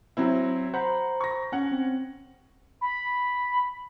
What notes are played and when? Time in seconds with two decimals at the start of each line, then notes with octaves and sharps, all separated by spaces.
0.17 F#3 C4 E4
0.74 C5 F#5 A#5 B5
1.21 C#6 A#6
1.52 C#4 F#5
1.72 C4
2.81 B5